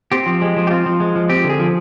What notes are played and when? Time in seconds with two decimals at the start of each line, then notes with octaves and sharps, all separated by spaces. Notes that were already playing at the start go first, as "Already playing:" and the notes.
0.12 C4 G4
0.26 F3
0.42 G#3
0.57 F3
0.67 G4
0.70 C4 F4
0.86 F3
1.00 G#3
1.16 F3
1.30 C4 G4
1.44 D3
1.49 G#4
1.59 F3